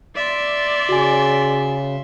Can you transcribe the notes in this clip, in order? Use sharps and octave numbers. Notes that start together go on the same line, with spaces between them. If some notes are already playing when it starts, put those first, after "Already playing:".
D5 E5 C6
C#3 F#4 G#5